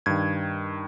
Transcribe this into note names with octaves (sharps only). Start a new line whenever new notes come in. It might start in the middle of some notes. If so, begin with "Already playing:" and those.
G2 D#3 G#6